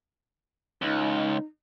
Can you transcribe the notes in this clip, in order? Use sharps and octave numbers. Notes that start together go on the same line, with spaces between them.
C#2 D#4